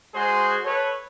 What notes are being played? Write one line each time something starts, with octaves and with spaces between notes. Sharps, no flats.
G#3 F#4 G#4 C5 C6
A4 B4 C#5